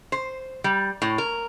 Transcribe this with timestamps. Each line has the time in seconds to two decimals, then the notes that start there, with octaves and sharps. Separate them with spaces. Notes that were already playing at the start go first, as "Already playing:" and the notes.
0.12 C5
0.64 G3
1.02 A2
1.18 A#4